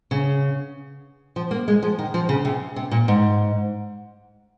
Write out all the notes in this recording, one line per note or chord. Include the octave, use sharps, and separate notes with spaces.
C#3
F3
A#3
G#3
F3
D#3
F3
C#3
C3
C3
A#2
G#2